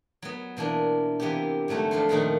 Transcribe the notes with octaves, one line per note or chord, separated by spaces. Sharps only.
F#3 B3
B2 E3 A#3 D4
C3 E3 A#3 B3 E4 G4
G#2 D3 F#3 A3 F#4
F3 D4 F4 A4 B4 C5
F2 A#2 D#3 A3 A#3 A4